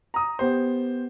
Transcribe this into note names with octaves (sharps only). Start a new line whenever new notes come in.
A#5 D#6
B3 G4 C5